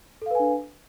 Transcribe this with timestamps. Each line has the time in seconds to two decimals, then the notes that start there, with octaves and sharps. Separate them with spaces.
0.22 A4
0.26 F5
0.31 B4
0.35 G#5
0.40 D4